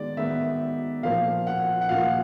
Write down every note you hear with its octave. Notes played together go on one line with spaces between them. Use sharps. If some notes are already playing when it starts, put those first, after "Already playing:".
Already playing: D#3 G#3 B3 D5
D#3 G#3 B3 E5
A#2 F3 A#3 F5
F#5
F#5
A#2 F3 A#3 F5